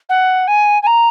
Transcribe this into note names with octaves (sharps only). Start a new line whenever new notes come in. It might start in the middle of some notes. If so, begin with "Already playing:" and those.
F#5
G#5
G#5
A#5